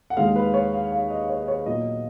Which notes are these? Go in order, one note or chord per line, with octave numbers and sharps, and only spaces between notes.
F#5
D#2 D#3 G#3 F5
B4
C#5
F5
F5
D#5
C#5
C#5
A#2 F#3 B3 D#5